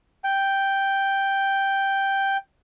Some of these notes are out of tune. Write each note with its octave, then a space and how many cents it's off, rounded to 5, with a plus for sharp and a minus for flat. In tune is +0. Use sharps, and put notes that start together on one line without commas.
G5 +0